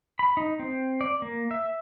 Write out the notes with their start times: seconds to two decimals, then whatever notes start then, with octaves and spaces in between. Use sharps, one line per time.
0.19 B5
0.37 D#4
0.59 C4
1.01 D5
1.22 A#3
1.51 E5